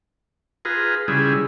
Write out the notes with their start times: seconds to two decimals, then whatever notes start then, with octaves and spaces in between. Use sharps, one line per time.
0.65 F4 G#4 B4 A#5
1.08 C#3 G3 E4 G#4